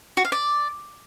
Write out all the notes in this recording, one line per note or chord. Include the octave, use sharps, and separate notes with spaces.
F#4
F5
D5